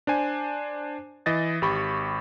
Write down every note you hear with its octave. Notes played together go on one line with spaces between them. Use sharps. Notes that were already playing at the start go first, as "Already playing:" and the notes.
D4 C5 G#5
E3 D#5 A6
G#1 G4 B5 C#6